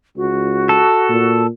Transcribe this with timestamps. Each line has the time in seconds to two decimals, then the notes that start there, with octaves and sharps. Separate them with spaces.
0.16 C#2 F#4
0.69 A4
1.09 A#2